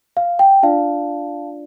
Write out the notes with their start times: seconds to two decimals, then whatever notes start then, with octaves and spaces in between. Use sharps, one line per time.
0.17 F5
0.39 G5
0.63 D4 F4 D5 F5 A5